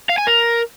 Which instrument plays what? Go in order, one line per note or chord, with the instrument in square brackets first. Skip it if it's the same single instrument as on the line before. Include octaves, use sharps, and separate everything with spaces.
[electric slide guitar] F5
G#5
A#4